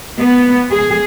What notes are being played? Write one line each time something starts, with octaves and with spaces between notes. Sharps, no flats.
B3
G#4